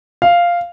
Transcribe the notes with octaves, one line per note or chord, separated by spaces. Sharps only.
F5